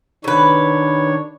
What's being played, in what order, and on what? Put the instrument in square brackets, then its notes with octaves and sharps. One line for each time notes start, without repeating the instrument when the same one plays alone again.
[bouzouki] C3 B4 [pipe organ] D#3 D4 C#5